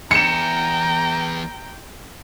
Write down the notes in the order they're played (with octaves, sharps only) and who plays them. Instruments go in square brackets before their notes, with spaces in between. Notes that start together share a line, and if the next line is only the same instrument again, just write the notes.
[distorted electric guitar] E2 [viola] G5 [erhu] A#5 [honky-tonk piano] C#7 E7